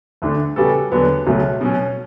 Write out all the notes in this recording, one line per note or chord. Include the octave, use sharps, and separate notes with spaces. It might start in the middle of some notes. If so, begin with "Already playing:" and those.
D2 D3 A3 D4
C#3 G3 B3 F#4 A4
E2 D3 F#3 B3
C#2 B2 F#3 A3 C#4
B2 F#3 C#4